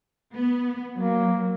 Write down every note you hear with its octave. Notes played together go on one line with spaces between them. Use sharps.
B3
F#3 A#3